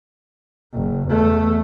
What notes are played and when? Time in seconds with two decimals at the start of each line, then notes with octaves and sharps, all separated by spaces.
0.74 F#1
1.08 E2 A3